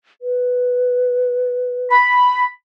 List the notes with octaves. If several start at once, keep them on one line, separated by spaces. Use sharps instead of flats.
B4
B5